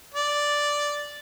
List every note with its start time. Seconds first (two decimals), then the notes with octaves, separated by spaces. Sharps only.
0.15 D5